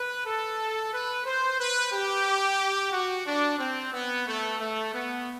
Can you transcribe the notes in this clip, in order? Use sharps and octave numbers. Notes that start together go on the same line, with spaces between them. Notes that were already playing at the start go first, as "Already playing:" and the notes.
Already playing: B4
A4
B4
C5
B4
G4
F#4
D4
C4
B3
A3
A3
B3